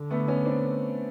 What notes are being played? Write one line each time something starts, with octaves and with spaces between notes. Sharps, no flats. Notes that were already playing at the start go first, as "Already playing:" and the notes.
Already playing: D3
A3 B3
B3 C#4
C4 D4